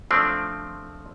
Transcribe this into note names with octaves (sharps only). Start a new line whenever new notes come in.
F3 A3 C4 D4